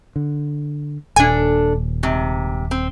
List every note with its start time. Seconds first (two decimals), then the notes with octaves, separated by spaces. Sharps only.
0.16 D3
1.16 D#1 A#2 D4 A4 G#5
2.03 G#2 C3
2.71 C4